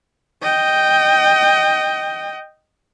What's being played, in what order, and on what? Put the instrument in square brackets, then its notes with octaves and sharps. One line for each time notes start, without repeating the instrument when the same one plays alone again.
[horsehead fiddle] D#5 G5